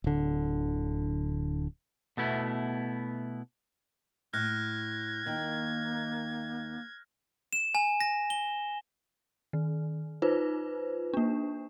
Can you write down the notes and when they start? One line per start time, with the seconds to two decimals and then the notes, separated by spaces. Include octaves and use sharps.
0.04 D1 D3
2.17 B2 A3 B3 E4
4.33 A2 F6 F#6 G#6 A#6
5.26 D#2 D#3 A#3
7.53 E7
7.75 G#5
8.01 A#6
8.30 G7
9.53 D#3
10.22 D#4 F4 B4 C5
11.14 A#3 D4